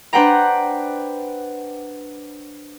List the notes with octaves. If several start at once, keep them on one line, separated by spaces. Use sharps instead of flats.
D4 B4 C5 F#5 G5 A#5